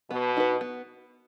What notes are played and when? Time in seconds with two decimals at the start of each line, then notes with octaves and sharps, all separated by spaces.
0.11 B2 B3
0.37 D#4 F#4 B4
0.61 B3